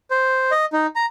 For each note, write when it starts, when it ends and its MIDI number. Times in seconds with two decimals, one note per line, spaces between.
0.11 0.51 72
0.51 0.65 75
0.73 0.87 63
0.96 1.06 82